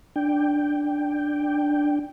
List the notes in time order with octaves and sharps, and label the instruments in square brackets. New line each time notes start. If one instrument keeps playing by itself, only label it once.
[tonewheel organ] D4 G5